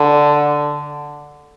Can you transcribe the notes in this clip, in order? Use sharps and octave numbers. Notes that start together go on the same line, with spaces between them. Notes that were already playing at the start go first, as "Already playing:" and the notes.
Already playing: D3